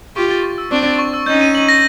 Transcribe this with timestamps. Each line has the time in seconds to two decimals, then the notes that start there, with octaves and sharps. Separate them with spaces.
0.16 F4 G4 C#6
0.31 A6
0.43 C#6
0.58 E6
0.71 C4 D4 C#6
0.86 A6
0.99 C#6
1.14 E6
1.26 C#4 D#4 G6
1.41 D#7
1.55 F#7
1.69 A#6